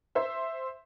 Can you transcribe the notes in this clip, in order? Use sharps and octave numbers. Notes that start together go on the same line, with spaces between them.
C5 E5